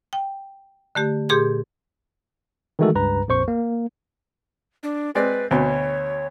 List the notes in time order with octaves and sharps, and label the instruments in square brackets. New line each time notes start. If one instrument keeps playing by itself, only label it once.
[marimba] G5
D3 A3 G4
A#2 G4 G#4 C6 G6
[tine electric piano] D#3 E3 G#3 A3 F#4 A4
C#2 G2 B4 A#5
A#1 F2 C5 C#6
A#3
[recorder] D4
[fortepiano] G#3 C4 D5 [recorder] B4
[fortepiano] D2 B2 [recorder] C#5